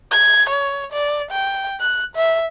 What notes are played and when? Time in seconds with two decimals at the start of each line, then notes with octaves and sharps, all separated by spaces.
0.12 G#6
0.50 C#5
0.92 D5
1.31 G5
1.80 F#6
2.16 E5